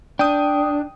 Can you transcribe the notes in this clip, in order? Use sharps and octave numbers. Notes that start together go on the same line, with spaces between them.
D4 G5 D#6